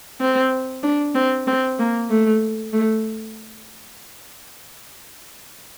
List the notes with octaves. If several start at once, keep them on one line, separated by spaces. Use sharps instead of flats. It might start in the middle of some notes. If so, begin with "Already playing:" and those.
C4
D4
C4
C4
A#3
A3
A3